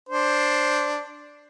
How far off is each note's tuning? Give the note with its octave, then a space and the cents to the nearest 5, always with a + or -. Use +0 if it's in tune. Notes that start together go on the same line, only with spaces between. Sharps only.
D4 +0 C5 +5